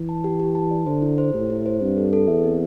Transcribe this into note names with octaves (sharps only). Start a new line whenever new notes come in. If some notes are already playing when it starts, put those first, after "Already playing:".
Already playing: E3
A5
G4
G4
A5
D5
D3 C5
E4
C5
A2 G4
E4
C5
G2 C4
A4
A4
E2 E5
C4